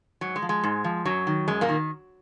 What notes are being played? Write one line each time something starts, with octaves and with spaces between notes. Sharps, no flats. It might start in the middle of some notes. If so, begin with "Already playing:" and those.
G#2 F#3
G#3
F3
G#3
G#2
F3
F#2 F#3
D#3
F#2 G#3
A#2 A#3
D#3